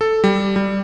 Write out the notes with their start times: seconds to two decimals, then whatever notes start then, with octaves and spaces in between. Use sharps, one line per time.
0.01 A4
0.24 G3
0.56 G3